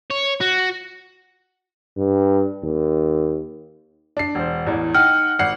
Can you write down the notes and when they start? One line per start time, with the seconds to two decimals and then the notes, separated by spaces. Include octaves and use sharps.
0.11 C#5
0.41 F#4
1.97 G2
2.63 D#2
4.17 D4 C7
4.35 E1 C5
4.67 A1 E2
4.95 D#4 F#5 G5 F6
5.39 G#1 F#5 C7